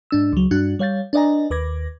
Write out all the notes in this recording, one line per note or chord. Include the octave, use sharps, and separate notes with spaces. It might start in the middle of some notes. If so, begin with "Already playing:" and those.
G#2 D4 E6
C#2 F#3
G2 D4 F#4 F#6
G3 C#5 F5 G6 A6
D4 B4 D5 D#5 G#5 A#5
D#2 B4 D6 G#6 A#6